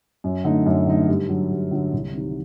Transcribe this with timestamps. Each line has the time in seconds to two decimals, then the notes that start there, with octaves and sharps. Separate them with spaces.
0.24 F#2
0.44 D3 A3 D#4
0.66 F#2
0.87 D3 A3 D#4
1.08 G2
1.29 D3 F#3
1.50 G2
1.71 D3 F#3
1.93 C2
2.14 C3 D#3